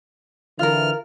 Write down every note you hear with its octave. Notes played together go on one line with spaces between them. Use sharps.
D3 E3 F4 A#4 F6